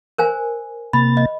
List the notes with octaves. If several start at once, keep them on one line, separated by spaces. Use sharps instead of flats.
A#4 C5 G#5
C3 A#3 B5 A6
D#5